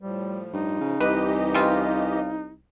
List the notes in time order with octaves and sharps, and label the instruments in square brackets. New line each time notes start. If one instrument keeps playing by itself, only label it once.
[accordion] A2 F3 [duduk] G3
[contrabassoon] G2 [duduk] D#4
[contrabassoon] C#3
[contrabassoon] C2 [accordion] E3 G4 D#5 [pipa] B4
[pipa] C#3 C4 F4